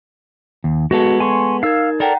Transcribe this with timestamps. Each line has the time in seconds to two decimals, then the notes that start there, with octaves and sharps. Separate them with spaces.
0.64 D#2
0.91 G#3 B3 F#4 A4
1.20 G#5 C6 C#6
1.63 D#4 A#4 F5 E6 G#6
2.00 A4 A#4 D5 F#5 G5 A#5